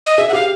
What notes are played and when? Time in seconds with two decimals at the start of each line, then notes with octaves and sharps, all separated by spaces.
0.06 D#5
0.18 G#4 E5
0.29 F#5
0.33 G4 F5